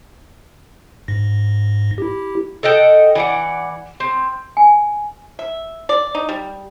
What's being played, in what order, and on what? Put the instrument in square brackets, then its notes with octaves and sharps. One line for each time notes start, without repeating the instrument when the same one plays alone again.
[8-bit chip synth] G#2 A#6
E4 G4
[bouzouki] A4 D#5 F#5 G5
E3 D5 F#5
C4
[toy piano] G#5
[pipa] E5
D5
D#4
G3